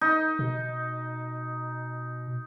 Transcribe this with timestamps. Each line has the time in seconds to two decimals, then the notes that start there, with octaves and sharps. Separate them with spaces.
0.01 D#4
0.39 B2